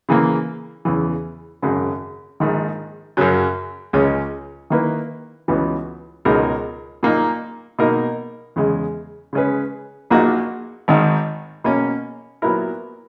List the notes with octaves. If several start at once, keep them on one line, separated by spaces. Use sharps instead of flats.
C#3 E3 A#3
E2 C#3 E3
G#1 F#2 C#3 F#3
A#1 G#2 D#3
F#2 C#3 F#3 C#4
C#2 C#3 G#3 C#4
D#3 A#3 E4 B4
C#2 C#3 E3 B3 F#4
C#2 B2 G#3 D#4 A#4
A#2 A#3 D#4
B2 A#3 D#4 A#4
E2 C#3 G#3
C#3 G#3 C#4 G#4 B4
A#1 A#2 A#3 D#4 F#4
G#1 G#2 D#3
B2 A#3 C#4
A#2 F#3 B3 E4 A#4